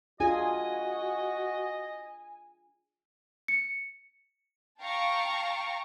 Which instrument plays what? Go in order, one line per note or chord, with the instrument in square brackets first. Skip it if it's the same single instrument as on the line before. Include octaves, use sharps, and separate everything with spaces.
[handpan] D4 F4 G#4 [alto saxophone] F#4 [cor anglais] D#5 [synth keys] G#5
[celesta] C#7
[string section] F5 G5 A5 A#5 C#6